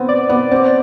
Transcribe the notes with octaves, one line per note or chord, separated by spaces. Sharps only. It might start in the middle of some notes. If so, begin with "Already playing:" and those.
Already playing: B3 C4
D5
B3
C4